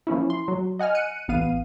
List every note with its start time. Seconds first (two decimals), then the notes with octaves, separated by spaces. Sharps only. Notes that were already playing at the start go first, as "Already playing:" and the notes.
0.07 F3 A#3 C#4 E4
0.30 C6
0.48 F#3
0.79 D#5 F#5 G#5 F6
0.95 F#6 C#7 D#7
1.28 A1 B3 F5 D#7